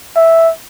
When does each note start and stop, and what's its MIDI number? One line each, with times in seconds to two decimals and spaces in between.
0.16 0.51 76